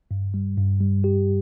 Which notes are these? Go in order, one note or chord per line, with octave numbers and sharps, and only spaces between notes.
G2
G3
G2
G3
G4